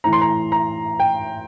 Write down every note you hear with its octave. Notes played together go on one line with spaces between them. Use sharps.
A2 E3 A#5
C6
A#5
A#5
G5